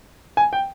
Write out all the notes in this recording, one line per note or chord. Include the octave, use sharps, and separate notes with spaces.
G#5
G5